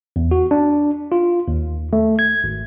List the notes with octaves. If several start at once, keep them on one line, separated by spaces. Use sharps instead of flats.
E2
F#4
D4
F4
D#2
A3
G#6
G#1